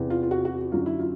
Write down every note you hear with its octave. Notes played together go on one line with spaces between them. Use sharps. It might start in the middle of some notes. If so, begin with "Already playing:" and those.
Already playing: E2 C3 E3
F4
F4
F#4
F#4
F#2 D3 F#3 F4
E4
F4